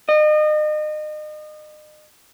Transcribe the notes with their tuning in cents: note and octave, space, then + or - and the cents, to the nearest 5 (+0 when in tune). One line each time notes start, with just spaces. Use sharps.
D#5 -35